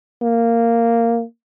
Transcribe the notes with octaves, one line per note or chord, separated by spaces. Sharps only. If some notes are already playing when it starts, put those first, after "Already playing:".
A#3